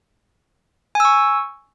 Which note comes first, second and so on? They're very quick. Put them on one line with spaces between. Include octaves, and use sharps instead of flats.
G#5 E6 C#6